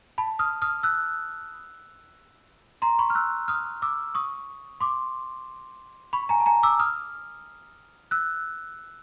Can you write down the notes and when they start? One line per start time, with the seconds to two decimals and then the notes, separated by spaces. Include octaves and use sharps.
0.18 A5 B5
0.39 D#6 F6
0.62 D#6 F6
0.83 E6 F#6
2.82 A#5 C6
2.99 B5 C#6
3.10 F6
3.15 E6 F#6
3.48 D#6 F6
3.82 D6 E6
4.15 C#6 D#6
4.80 C6 D6
6.13 B5 C#6
6.29 G#5 A#5
6.40 A5
6.46 G#5 A#5
6.63 D6 E6
6.79 D#6 F6
8.11 E6 F#6